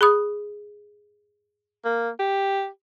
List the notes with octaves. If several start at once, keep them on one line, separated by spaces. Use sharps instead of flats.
G#4 B5 D#6
A#3
G4